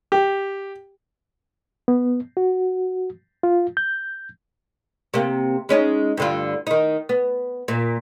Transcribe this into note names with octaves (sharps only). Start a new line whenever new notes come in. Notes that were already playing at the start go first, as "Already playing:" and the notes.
G4
B3
F#4
F4
G6
C3 A#3
G#3 C#4 D#4
G2 D3 F4
D#3 D#4
B3
A#2